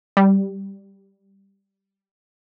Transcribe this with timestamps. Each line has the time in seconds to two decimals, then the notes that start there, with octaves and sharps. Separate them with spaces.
0.17 G3